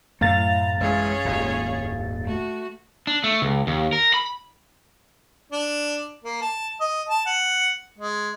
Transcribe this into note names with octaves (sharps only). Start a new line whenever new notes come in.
F#2 A2 A3 F5 A#5 A6
A1 G#3 C#4 G#4 C#5
D#1 G#1 D#2
A3 F#4
D4
A3
C#2
D#2
A#4
B5
D4
A#3
A5
D#5
A5
F#5
G#3